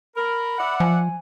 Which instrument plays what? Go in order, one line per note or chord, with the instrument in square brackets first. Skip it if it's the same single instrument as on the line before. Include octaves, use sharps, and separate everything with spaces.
[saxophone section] A#4 [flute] B5
[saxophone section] D5 E5 F#5
[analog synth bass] F3 [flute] G#5